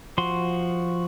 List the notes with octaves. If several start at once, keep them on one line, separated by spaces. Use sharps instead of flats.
F3 F#4 C6